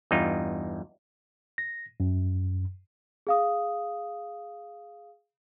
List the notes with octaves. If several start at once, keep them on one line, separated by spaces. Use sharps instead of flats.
E2 G2 D#4 F4
A#6
F#2
G#4 F5 D#6